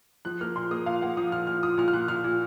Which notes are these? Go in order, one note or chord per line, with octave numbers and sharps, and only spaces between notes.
F3 F#6
A#3 F6
A#2 C6
A#3 D#6
A#2 F5
A#3 F#5
F3 D#6
A#2 F6
A#2 F6
A#2 D#6
A#2 F6
F6
A#2 F#6
A#2 F6
A#2